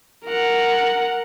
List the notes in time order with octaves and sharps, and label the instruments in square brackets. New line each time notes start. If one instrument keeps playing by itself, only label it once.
[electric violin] A#4 F#5